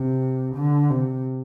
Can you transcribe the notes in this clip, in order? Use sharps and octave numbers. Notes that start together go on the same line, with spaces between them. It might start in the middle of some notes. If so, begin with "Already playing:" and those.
Already playing: C3
D3
C3